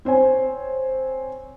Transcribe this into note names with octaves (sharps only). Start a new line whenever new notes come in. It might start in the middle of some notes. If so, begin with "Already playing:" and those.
C4 C5 C#5 G#5